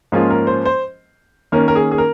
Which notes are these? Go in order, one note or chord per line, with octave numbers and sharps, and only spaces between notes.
G#2 F3 A#3 C#4 F4 G#4
A#4
C5
C5
D#3 A#3 C#4 A#4
A#4
G#4
G#4
A#4